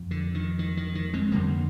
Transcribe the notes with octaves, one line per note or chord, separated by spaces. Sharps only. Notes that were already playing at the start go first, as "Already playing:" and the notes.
Already playing: F2
D3
D#3
D#3
D#3
D#3
G#3 C4
F2 D3 G3 A#3